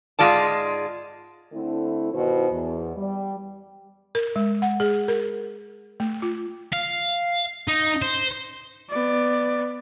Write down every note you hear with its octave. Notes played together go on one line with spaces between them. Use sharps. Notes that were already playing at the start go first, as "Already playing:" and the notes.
G#2 G#3 F4 D5 A5
D3 A3 C4 E4
G2 B2 D#3 E4 F#4 C5
E2
G3
A#4
G#3
F#5
G#4
A#4
A3
F4
F5
D#4
C5
B3 D5